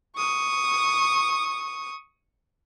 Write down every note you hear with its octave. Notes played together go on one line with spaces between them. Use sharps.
C#6 D#6